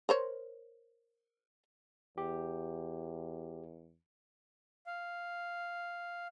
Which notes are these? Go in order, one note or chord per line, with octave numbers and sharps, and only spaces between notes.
A#4 C5 C#5
E2 G4
F5